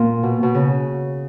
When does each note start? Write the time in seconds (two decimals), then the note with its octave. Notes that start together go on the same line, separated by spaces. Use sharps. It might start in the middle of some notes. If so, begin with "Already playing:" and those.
Already playing: A#2
0.23 B2
0.43 B2
0.54 C#3